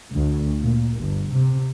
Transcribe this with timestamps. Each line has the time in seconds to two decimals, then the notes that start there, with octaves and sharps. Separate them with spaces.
0.12 D2
0.61 A#2
0.99 G1
1.31 C3